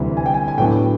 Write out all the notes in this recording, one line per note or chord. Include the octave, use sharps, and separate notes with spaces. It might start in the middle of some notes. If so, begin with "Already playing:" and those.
Already playing: D2 C3 E3 G3
G#5
G5
G#5
G#5
A2 F#3 B3 D4 G5